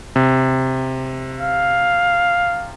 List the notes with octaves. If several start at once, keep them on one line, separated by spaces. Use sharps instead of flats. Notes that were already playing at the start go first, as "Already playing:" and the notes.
C3
F5